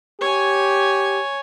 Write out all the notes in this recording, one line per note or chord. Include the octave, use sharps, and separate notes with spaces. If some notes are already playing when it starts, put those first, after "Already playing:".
G4 C#5 G#5